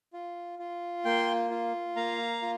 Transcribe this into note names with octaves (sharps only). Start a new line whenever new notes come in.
F4
F4
A#3 G5 C6
F4
A#3 F5 A#5
F4